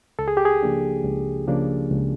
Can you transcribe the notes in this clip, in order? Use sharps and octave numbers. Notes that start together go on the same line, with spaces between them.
C#2 A4
G#4
G4
G#4
C#3 F3 A#3 D4
C#2
C#3 F3 A#3 D4
C#2